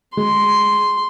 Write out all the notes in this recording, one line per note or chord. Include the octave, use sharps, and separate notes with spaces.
G#3 C6